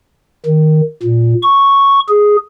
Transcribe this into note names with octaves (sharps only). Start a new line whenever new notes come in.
D#3
A#2
C#6
G#4